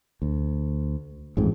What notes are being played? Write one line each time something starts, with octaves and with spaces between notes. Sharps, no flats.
D2
A1 F2 G#2